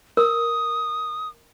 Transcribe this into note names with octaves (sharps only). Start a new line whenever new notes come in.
A#4 D#6